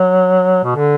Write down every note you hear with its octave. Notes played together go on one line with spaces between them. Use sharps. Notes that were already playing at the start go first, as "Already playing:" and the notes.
Already playing: F#3
B2
D3